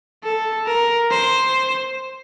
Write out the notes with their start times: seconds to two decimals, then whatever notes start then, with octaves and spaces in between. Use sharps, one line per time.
0.24 A4
0.67 A#4
1.11 C5